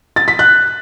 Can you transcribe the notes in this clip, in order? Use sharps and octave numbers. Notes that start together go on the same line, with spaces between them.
A6
B6
F#6